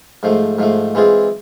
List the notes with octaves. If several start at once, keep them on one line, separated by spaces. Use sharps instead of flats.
G#2 F3 A3
G#2 F3 A3
E3 G#3 C4 F4 G#4